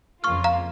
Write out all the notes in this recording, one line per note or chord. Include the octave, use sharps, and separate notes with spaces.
F2 C#3 A#3 F4 C#6 F6
F5 A#5